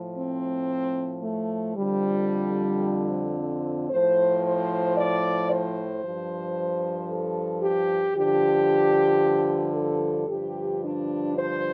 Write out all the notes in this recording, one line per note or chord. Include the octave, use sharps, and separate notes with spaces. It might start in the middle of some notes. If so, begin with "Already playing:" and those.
Already playing: A2 F3
C4
A3
F2 D3 F3 G3
C4
A2 F3 C5
C5
D5
C5
G2 F3
A4
G4
G2 D3 F3 G4
A4
G2 D3 F3 G4
D4
C5